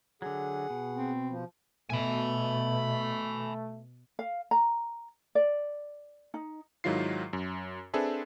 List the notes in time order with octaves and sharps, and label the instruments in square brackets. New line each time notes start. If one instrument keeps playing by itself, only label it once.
[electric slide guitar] D3 F#3 [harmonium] G#4 F#5
[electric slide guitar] B2
[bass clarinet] C4
[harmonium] F3
[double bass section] B2 [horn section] A3 [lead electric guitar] G#5 B5
[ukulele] F5
A#5
D5
D#4
[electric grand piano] G#2 D#3 F#3 E4 F4 C7
F#2
C4 D4 G#4 A4 B4 E5